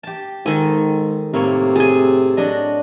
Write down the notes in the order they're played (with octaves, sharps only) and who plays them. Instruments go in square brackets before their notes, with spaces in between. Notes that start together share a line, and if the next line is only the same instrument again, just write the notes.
[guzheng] G4 A5
[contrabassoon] G#2 [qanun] D#3 G#5 [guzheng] A4
[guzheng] A2 A#3 C#5 [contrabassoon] C3
[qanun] G#4 G#5 [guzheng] A5
[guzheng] F#3 D4 D#5